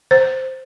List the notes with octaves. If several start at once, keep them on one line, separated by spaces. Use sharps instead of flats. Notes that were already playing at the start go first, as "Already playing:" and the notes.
C5